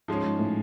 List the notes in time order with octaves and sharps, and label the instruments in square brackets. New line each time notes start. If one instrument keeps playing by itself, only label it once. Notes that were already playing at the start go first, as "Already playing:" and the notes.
[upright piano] G#2 [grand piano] F3 G#3 C#4
[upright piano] G#2
A2